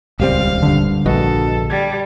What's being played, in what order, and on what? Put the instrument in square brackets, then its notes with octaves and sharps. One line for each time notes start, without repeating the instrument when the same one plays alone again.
[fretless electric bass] D#1 G3 C4 [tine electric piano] C#2 [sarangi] F5
[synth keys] G2 D3
[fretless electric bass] A#1 [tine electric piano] F#4 B4 D#5 [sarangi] A4
[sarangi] G3 [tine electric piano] G#6 A6